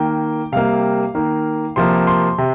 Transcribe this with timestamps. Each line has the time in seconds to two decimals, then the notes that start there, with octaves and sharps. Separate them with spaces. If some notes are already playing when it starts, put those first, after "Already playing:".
Already playing: D#3 A#3 G5
0.52 C3 G3 A#3 F5
1.15 D#3 A#3
1.76 C3 F3 A#3 C6
2.07 C6
2.38 C3